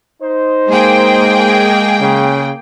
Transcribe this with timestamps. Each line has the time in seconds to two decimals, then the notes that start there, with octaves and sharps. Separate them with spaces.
0.22 D#4 C5
0.68 G#3 A#3 G#4 G5
2.01 C#3